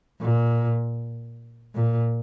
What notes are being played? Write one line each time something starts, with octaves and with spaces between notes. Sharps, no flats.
A#2
A#2